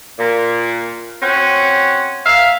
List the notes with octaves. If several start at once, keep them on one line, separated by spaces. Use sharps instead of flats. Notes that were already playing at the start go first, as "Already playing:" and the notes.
A#2
C4 C#4 F#4
A#3 E5 F5